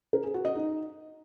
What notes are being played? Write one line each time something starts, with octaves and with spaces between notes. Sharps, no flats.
A#4
G#4
F#4
D#5
D#4